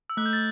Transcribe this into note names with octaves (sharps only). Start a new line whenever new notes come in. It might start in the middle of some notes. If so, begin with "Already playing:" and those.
E6
A3 F#6
G6
A6